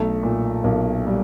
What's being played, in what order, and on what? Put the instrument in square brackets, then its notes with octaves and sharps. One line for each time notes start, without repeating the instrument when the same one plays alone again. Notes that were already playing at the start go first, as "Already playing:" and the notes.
Already playing: [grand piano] B1 [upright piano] A3
[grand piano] A#2
[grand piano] B1 [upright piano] A#3
[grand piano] G3